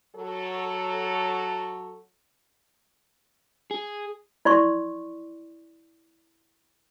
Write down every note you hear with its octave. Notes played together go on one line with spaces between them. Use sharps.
F#3 A4
G#4
E4 D5 C6 C#6